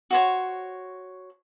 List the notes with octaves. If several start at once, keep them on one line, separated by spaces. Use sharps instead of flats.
F#4 C5 C#5